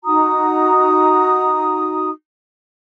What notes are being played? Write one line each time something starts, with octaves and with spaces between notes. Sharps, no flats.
D#4 F#4 A#5 D#6